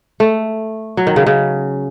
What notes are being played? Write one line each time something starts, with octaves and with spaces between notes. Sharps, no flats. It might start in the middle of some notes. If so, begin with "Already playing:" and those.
A3
F#3
D#3
C#3
C#3